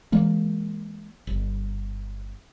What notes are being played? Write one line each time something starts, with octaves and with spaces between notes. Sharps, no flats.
E3 G#3 A#3
G1